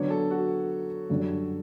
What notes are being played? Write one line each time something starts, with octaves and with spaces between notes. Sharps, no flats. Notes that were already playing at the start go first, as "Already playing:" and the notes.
Already playing: D3 F#3 B3 D4 C#5
A4
F#4
F#2 D3 G3